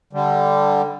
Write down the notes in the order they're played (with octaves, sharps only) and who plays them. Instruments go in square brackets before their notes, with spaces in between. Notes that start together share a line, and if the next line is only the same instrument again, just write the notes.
[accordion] D3 G3